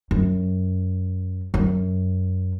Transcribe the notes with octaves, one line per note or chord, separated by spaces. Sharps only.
F#2
F#2